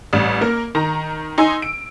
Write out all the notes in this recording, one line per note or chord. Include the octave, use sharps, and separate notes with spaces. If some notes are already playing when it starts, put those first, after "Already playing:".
A1 G3
A#3 A#4
D#3 A#5
D#4 G#5 C6 E6
D7